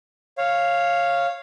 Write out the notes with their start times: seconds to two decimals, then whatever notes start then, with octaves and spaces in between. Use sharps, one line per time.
0.38 C#5 F5